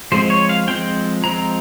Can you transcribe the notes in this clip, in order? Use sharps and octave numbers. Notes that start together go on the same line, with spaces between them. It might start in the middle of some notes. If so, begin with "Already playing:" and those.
F3 G#3 C4 C5
C#5
F5
F3 G#3 C4 G5
F3 G#3 C4 A#5